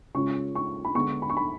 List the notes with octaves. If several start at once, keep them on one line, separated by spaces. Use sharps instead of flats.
C#3 G#3 C#4 F4 C#6
C#6
B5
D3 G#3 B3 C#6
B5
C#6
B5